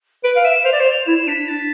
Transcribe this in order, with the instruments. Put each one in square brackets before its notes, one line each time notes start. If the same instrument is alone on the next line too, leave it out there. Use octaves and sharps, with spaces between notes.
[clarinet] B4 [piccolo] D7
[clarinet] F5 [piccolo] D7
[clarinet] E5 [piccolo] E7
[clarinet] C5 [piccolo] F7
[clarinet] D5
C5
[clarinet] E4 [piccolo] E7
[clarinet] D4 [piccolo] B6
[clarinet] D4 [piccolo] A6